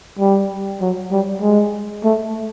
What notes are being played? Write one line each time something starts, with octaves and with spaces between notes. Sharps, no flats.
G3
F#3
G3
G#3
A3